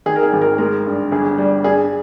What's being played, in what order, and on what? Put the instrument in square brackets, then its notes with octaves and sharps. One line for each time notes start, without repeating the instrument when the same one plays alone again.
[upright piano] D#3 G#4
A#4
G#4
G#1
A#4
G#3 A#4
G2
G1 G#4
G3
G2 G#4